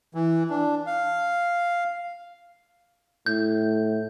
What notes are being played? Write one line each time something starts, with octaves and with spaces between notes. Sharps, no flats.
E3
D4
F5
A2 G6